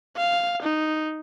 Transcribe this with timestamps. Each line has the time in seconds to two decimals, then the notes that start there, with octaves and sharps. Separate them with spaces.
0.17 F5
0.62 D#4